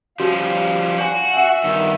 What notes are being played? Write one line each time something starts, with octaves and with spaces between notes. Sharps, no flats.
F3 G3 C#4 F#4 F5
F#4 D5 G#5
E5 F#5 G#5
G2 D#3